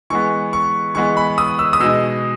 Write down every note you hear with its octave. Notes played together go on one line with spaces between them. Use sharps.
E3 G#3 B3 C#6
C#6
E3 G#3 B3 C#6
B5
D#6
E6
D#6
B2 G#3 D#4 E6